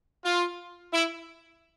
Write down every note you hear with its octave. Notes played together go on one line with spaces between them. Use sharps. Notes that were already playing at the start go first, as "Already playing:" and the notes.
F4
E4